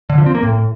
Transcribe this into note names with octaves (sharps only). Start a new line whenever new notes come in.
D3
F3
C4
A#3
A2